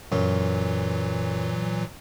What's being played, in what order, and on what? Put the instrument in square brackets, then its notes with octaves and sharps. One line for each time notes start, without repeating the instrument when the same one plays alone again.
[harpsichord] F#2 [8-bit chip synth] A#2 E3 F#3